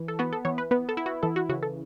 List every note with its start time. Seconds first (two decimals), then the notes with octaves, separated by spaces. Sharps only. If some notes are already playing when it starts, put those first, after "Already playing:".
Already playing: E3
0.08 A4
0.19 B3 F#4
0.33 A4
0.45 E3 C#5
0.58 B4
0.71 B3 B4
0.89 A4
0.97 E4
1.06 F#4
1.23 E3 A4
1.36 F#4
1.49 C#3 F#4
1.62 A4